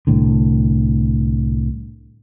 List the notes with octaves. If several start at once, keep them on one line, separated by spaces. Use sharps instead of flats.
C2 A2 D3